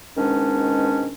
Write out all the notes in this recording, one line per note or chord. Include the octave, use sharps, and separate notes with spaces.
G#2 B2 D#3 G#3 C#4 D4